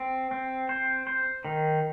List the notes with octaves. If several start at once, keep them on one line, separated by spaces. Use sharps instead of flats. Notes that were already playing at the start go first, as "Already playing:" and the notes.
Already playing: C4
C4
C5
C5
D#3